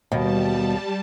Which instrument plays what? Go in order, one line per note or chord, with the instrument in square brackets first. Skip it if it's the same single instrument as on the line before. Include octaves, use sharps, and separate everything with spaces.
[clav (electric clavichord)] D#2 A#4 [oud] B2 [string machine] G3 A5